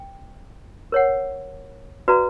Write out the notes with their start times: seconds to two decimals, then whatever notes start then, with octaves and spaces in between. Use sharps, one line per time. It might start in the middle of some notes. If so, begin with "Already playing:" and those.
Already playing: G5
0.92 A#4 C#5 F#5
2.08 F#4 B4 D5 F5 A#5